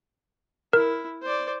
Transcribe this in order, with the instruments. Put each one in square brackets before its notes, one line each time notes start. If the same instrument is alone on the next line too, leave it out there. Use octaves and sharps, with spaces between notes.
[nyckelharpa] E4 [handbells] A#4
[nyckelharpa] C5 D5